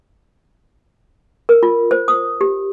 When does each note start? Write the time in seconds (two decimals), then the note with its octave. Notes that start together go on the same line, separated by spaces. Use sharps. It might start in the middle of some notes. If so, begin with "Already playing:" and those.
1.49 A#4
1.63 F4
1.91 C5
2.08 D#6
2.41 G4